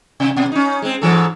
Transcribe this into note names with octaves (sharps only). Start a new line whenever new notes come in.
C3
B2
C#4 D#4
G#3 C4
G#2 E3 A4